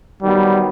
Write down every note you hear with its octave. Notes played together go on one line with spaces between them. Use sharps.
D#3 F#3 G3 B3